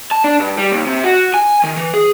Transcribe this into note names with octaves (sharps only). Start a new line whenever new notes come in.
A5
D4
G2
G3
D#2
C3
F#4
G#5
D#3
E3
G#4